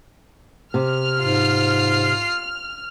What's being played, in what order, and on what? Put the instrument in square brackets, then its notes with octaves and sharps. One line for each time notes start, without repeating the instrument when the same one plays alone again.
[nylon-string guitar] C3 [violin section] F6
[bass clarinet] G#2 [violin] F4 C7